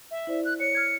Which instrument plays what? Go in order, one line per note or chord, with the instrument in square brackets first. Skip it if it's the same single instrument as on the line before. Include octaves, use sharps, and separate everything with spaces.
[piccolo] E5
[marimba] E4 C5 D5
[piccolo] F#6
[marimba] C#5 [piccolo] C#7
[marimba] F6 G#6